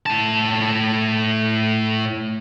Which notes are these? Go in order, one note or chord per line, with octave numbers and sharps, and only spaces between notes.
A2 A5